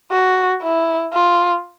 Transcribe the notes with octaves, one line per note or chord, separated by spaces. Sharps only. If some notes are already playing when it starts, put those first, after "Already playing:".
F#4
E4
F4